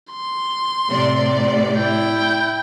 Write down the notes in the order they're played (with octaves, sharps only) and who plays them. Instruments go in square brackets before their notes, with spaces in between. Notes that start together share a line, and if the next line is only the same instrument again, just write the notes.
[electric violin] C6
[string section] A2 C3 D5
[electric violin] E4 G5